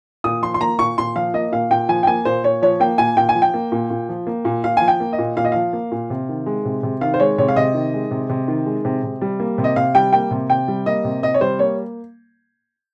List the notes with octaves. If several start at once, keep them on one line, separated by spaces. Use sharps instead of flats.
A#2 D#6
F3 C6
C6
A#3 A#5
A#2 C#6
A#2 C6
F3 F5
A#3 D#5
A#2 F5
A#2 G5
F3 G#5
G5
A#3 G#5
A#2 C5
A#2 C#5
F3 C#5
A#3 G5
A#2 G#5
A#2 G5
G#5
F3
G5
A#3
A#2
A#2
F3
A#3
A#2
A#2 F5
F3 G#5
G5
A#3
D#5
A#2
A#2 F5
D#5
F3 F5
A#3
A#2
C3
D#3
G#3
C3
C3
D#3 F5
C5
G#3 C#5
C3 C#5
F5
C3 D#5
D#3
G#3
C3
C3
D#3
G#3
C3
C3
G3
A#3
C3
D#5
C3 F5
G3 G5
A#3 G5
C3
C3 G5
G3
A#3 D#5
C3
C3 D#5
C#5
G3 C5
A#3 C#5